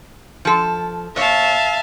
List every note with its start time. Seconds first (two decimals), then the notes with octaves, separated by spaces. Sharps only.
0.45 F3 A4
1.16 A#2 C#5 E5 F5 A5